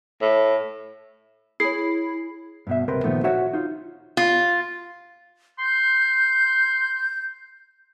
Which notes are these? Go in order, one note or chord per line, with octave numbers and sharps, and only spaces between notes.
A2
E4 G#4 C#5 C7
G2 B2 E5
C#2 C3 A#4 B4 C6
A#2 D#3 F3 A3 B3
F#4 C#5 E5 F#5
D#4 F4
F4
C6 G6